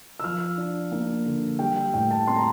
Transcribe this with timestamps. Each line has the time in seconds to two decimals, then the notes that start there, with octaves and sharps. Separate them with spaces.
0.20 E6
0.24 F3 F6
0.57 D4
0.92 A#3
1.26 D3
1.59 G3 G5
1.76 G5
1.94 A2 G5
2.11 A5
2.27 C4 C6
2.36 A#5